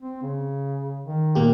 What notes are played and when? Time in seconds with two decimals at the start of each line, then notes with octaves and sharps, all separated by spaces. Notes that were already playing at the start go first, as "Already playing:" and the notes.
0.02 C4
0.23 C#3
1.06 D#3
1.35 A#2 A#3 G4